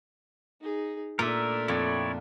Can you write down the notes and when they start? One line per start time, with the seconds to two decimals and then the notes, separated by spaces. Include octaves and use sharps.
0.61 D#4 G#4
1.19 A#2 A3 D4 A#4 E5
1.68 F2 E4 C#5 D5